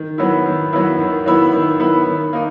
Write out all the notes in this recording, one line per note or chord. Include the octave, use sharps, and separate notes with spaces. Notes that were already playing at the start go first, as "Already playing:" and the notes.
Already playing: D#3
F#3 B3 E4
D#3
F#3 B3 E4
D#3
F#3 B3 E4
D#3
F#3 B3 E4
D#3
A#3 D#4